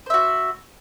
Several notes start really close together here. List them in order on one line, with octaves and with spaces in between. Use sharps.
C5 E5 F#4